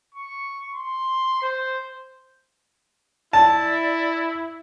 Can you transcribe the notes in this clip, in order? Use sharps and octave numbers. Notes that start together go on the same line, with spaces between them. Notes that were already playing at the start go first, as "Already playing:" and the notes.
C#6
C6
C5
E4 D5 A5